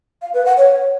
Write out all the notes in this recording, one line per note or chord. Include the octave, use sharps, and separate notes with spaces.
F5
B4
F#5
C#5